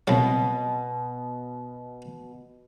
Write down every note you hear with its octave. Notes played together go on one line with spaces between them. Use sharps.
C2 B2 F#3